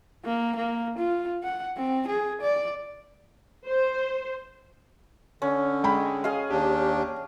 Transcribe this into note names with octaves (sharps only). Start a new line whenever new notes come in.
A#3
A#3
F4
F#5
C4
G#4
D5
C5
D3 C#4
G#3 G5 B5
G#4 D#5 F5
D#2 D4 G4